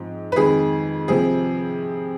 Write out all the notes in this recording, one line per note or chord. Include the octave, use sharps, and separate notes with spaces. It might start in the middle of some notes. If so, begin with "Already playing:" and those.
Already playing: G#2 F3 C4
B4
F2 D#3 G#3 G#4
C3 F3 C4 G#4